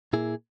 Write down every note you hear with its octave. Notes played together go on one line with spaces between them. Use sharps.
A#2 A#3 E4 G#4